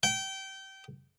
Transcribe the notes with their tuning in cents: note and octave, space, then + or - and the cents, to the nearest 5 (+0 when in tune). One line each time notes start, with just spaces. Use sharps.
G5 -25